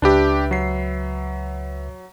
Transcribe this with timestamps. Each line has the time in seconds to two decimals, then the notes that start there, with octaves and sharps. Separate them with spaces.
0.02 C#2 D4 G4 B4 E5
0.51 F#3 C7